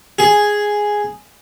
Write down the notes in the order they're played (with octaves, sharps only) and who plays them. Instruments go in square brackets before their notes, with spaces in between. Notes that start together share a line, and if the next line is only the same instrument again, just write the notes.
[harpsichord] G#4